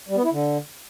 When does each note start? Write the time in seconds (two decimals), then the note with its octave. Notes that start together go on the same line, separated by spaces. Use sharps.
0.09 G3
0.16 B3
0.24 E4
0.32 D3